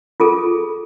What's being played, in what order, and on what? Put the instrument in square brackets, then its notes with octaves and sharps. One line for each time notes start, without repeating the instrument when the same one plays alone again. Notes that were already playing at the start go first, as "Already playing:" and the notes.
[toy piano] F4 G#4 A4